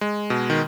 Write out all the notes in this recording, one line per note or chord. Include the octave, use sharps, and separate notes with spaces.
G#3
B2
D#3